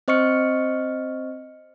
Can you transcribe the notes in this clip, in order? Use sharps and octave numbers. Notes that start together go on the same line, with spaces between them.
C4 C5 D#5 C#6 F6 C#7